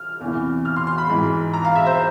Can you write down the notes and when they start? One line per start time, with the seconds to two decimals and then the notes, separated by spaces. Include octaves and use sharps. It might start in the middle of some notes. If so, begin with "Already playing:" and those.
Already playing: F6
0.21 E2 C3 E3
0.65 F6
0.76 C6
0.87 C6
0.98 B5
1.09 G#2 E3
1.53 A#5
1.65 F5
1.76 E5
1.86 C5